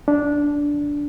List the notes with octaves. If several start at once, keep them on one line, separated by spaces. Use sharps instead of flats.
D4